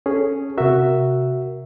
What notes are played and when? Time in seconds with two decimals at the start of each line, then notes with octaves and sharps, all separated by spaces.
0.06 C#4 G#4 A4
0.58 C3 F#4 A#4 E5